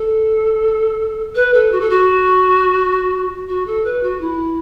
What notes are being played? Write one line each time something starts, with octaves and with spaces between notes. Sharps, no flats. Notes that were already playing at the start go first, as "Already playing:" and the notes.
Already playing: A4
B4
A4
F#4
A4
F#4
F#4
A4
B4
F#4
E4